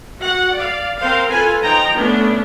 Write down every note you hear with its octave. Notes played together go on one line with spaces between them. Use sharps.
F#4 F#5
D5 F5
C4 A#4 C5 F5
F4 A4 B4 G#5
F3 D#4 G5 A#5
A3 B3 C#4 D4